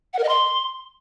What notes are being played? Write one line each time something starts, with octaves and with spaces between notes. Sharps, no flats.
F#5
A#4
D#5
C6